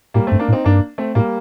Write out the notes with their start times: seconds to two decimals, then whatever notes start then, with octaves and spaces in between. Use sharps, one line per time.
0.14 A2 G3 A#3
0.27 A3 C4
0.32 G2
0.39 A#3 D4
0.48 A2
0.52 C4 D#4
0.64 G2 A#3 D4
0.98 A3 C4
1.15 A2 G3 A#3